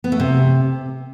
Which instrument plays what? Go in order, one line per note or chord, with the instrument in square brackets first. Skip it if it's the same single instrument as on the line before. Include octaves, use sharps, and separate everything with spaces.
[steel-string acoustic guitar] B3
A3
C3